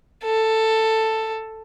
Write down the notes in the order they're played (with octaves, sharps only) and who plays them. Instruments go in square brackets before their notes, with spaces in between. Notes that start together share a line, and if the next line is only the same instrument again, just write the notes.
[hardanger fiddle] A4